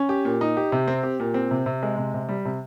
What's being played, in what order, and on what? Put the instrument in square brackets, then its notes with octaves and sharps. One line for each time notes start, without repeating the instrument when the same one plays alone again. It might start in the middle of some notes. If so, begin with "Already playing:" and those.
Already playing: [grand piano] C#4
G4
A#2
D#4
G4
C3
C4
G4
A#2
C4
C3
C3
G#3
C3
C3
G3
C3